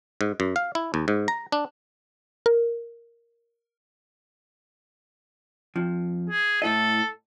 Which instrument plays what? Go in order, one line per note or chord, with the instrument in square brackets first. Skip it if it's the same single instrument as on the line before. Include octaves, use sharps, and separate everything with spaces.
[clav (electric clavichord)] G#2
F#2
F5
E4
D#2
G#2
A#5
D4
[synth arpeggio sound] A#4
[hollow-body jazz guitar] F2 F3
[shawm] G#4
[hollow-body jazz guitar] A2 E4 D#5 [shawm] A4